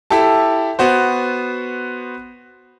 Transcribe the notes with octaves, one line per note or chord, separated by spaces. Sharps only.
E4 G4 A4 A5
B3 F#4 C5